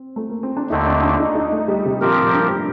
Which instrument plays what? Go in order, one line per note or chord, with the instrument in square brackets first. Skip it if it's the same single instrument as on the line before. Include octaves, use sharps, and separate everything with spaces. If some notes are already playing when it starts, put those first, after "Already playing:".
Already playing: [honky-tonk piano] C4
A3
A#3
C4
D4
[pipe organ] D#2 D3 A3 C4 [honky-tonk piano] D#4
[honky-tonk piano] D4
D4
D#4
D#4
A3
G3
C3
[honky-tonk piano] A#2 [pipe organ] F3 C4 G4 A#4
[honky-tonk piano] A2
G2